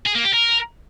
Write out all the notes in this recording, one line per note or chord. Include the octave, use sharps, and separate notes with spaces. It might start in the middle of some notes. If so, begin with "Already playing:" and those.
G#4
A#3
G4
A#4